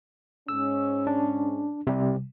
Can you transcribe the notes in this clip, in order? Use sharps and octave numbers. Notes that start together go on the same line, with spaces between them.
G#2 C#4 E6
D4
C3 G3